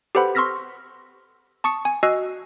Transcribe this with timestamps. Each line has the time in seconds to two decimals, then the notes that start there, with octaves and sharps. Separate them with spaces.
0.15 G4 A4 B4 C5 F#5 B5
0.35 C6 C#6 E6 F6 A#6 B6
1.64 A5 C#6 D#6 C#7
1.85 G#5
2.03 F#4 D#5 G#5 E6 F#6 C7